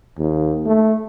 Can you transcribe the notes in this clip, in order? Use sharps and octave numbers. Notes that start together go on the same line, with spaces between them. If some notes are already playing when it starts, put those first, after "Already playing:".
D#2
A3